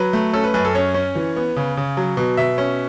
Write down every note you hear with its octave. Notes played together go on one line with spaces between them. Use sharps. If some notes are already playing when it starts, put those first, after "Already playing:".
Already playing: F#3 B4
A3
C#4 A4
B4
F#2 B4
A4
C#4 C#5
C#4
E3
B3
C#3
C#3
F#3
B2
B2 E5
C#4